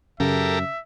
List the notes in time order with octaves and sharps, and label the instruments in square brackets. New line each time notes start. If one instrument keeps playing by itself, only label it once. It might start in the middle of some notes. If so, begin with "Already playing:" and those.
[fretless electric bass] F#2 [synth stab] C#3 [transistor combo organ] G4 A4 A#4 [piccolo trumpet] E5